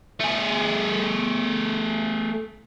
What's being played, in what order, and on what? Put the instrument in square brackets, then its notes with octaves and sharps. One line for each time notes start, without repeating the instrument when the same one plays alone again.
[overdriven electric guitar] A3 G#4